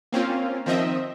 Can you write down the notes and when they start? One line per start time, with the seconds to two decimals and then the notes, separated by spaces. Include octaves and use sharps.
0.13 A#3 C4 C#4 F4
0.66 D#3 F3 C4 D#5 E5